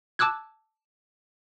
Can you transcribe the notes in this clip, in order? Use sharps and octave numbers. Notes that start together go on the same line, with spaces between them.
A5 D6 E6 F#6 G#6